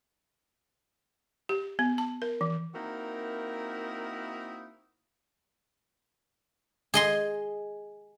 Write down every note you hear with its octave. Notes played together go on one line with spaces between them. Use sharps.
G4
B3
A5
A#4
E3
A#3 C4 D#4 E4 F#4 A#4
G#4 D#5 C6